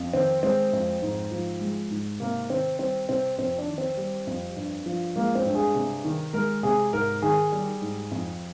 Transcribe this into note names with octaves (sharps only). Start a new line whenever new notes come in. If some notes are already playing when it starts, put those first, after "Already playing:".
Already playing: F2
D#3 C4
G#3 C4
F2
G#2
F3
G#3
G#2
C3 A#3
D#3 C4
G3 C4
C3 C4
F2 C4
D4
D#3
C4
G3
F2
G2
F3
G#3 A#3
C4
G2
G#4
C3
D#3
G#3 A#4
C3 G#4
G#2 A#4
D#3 G#4
G3
G#2
F2